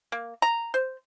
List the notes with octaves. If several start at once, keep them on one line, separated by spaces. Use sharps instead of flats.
A#3
A#5
C5